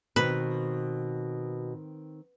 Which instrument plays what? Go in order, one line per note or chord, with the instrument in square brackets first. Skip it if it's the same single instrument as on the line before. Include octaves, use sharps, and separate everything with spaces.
[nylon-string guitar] B2 [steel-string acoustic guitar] D#3 C4 [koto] B4